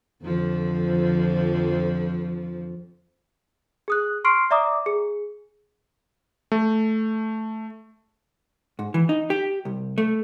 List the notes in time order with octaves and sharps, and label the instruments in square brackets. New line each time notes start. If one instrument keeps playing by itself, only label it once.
[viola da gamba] F2 D3 F3
[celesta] G#4 D#6 F#6
C6 C#6 F6 C7 D7
D5 E5 A#5 D6 D#6
G#4
[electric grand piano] A3
[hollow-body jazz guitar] G#2
E3
D#4
G4
C2
A3